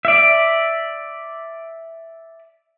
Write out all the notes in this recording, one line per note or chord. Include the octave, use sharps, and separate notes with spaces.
D5 E5